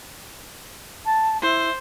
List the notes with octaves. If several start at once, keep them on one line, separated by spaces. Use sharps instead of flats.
A5
E4 C5